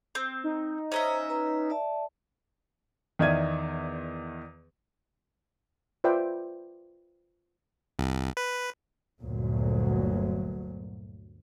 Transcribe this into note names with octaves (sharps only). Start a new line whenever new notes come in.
C4
D#4
C#4 C5 D#5 E5 A#5
B4 A#5
D5 E5 A5
E2 D#3 D5 E5 G#6 D#7
F4 B4 C5 D5 E5 G5
C2
B4
G1 D2 A#2 F#3